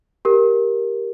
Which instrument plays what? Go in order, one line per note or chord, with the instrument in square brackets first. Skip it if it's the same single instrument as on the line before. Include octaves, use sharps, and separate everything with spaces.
[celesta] G4 A#4